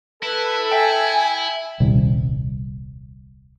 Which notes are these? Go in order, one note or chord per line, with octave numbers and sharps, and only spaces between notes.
E4 A4 B4
E5 G5 G#5
D#1 C2